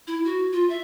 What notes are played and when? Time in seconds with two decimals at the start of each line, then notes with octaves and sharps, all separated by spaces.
0.07 E4
0.25 F#4
0.53 F4
0.70 E5